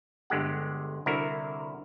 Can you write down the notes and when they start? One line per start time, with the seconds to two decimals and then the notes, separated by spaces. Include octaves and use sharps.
0.30 G1 D3 G#3 G4 F#5
1.06 C2 D3 E4 F#4 A#4